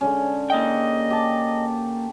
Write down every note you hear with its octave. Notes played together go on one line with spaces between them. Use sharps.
D3 G#3 C#4
A#3 D#5 G5
G4 A5